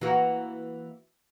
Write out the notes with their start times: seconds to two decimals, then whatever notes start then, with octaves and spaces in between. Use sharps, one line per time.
0.01 E3 A#3 F#4